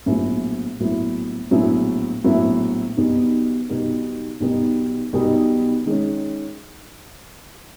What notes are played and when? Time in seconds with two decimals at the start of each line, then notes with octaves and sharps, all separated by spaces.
0.06 A#1 A2 F#3 B3 E4
0.79 A#1 A2 F#3 B3 E4
1.51 A#1 A2 F#3 B3 E4
2.24 A#1 A2 F#3 B3 E4
2.96 B1 B2 G3 B3 D#4
3.68 B1 B2 G3 B3 D#4
4.40 B1 B2 G3 B3 D#4
5.13 B1 B2 G3 B3 D#4
5.86 D#3 G#3 C#4